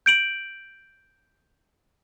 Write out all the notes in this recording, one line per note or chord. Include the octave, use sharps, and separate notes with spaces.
G6 D7 F#7